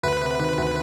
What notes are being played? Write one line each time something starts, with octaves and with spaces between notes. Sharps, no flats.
D2 B4
C3
D#3
D2